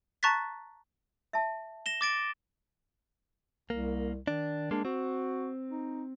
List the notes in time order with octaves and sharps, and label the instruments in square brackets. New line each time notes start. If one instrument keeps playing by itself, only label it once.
[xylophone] A5 A#5 C#6 F#6 A6 B6
[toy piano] E5 A5
[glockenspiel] A#6 E7 G7
D6 A6 D7
[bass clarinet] C2 [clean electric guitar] A#3
[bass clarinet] D#3 [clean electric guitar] D4
[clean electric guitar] G#3 A#3 [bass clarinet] D4
[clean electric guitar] C4 [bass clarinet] F#4
[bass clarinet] D#4